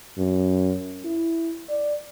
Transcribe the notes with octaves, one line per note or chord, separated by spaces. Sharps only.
F#2
E4
D5